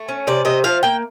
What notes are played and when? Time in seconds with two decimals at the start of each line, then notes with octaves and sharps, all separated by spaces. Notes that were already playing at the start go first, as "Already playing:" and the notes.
Already playing: A3
0.09 C#4
0.27 C3 D5
0.45 C3 D#5
0.64 F3 F5
0.83 A#3 G5